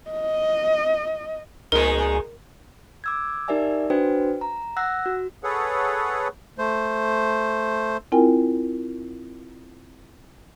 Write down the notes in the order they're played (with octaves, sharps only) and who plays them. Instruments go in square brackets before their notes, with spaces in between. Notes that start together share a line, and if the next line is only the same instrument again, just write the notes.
[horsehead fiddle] D#5
[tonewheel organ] C#2 [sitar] A#2 G#3 D#4 [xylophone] A#4
[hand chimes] D6 E6 G#6
D#4 G4 A#4 D5 E5 G#5
D4 F#4 B4 C5 G5
A#5
F#5 E6 F#6 A#6
F#4
[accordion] G#4 A4 B4 C#5 F#5
[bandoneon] A3 C5
[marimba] C4 E4 F4 A#4 G5 G#5